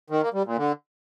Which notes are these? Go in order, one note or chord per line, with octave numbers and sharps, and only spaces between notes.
D#3
A#3
G3
A#2
D3